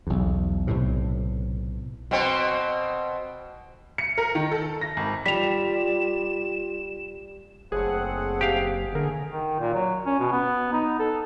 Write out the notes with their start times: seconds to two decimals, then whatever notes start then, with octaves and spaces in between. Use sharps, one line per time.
0.07 B1 E2
0.67 B1 A2 C3
2.11 B2 C4
3.98 C#7
4.18 A#4
4.35 D#3
4.52 A4
4.81 A#6
4.97 G#1
5.26 G3 F4 B6 E7 F7
7.72 F#1 A3 C4 G#4 F#5
8.41 G4 F5
8.95 D3 A3 A#3 G#4 A#4
9.31 D#3
9.60 A#2
9.74 F#3
10.06 C#4
10.19 B2
10.32 B3
10.73 D#4
10.99 A4